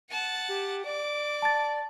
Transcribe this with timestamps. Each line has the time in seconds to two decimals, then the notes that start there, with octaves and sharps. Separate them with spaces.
0.11 F#5 A5
0.49 G4
0.85 D5 D6
1.42 A5 A6